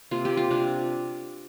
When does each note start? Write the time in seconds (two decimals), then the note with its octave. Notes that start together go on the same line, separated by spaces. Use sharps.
0.11 C3 A#3 F4
0.25 G4
0.37 F4
0.50 C3 A#3 D4